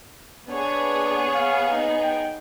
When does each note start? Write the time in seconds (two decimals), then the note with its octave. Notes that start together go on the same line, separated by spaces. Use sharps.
0.49 B3 D4 G#4 C#5
1.34 F5
1.68 D#4
2.03 G5